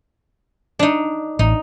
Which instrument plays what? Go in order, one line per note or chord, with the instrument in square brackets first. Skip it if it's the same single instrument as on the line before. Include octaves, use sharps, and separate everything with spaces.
[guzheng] D4 D#4
[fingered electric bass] A1 [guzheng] D#4